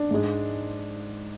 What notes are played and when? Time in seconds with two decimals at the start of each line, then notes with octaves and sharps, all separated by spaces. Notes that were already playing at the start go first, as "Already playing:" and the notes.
Already playing: D4
0.11 G#2 G#3